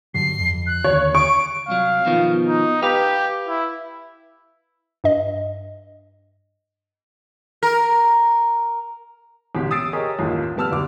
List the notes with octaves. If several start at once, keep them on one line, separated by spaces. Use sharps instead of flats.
G2 D3 F#3 C7
F2
F#6
D#2 D3 C#5
C#6 D7
C2 F#3 F5
B2 D#3 F3
D#4
G4 B4 F5
E4
G2 D#5
A#4
A1 D2 B2 G4
D#6 E6 A6 C7 D7
G4 G#4 A#4 C#5 D#5 D#6
A1 D#2 A#3 F4
D1 G3 B3 A5 E6 F6
D2 G3 D6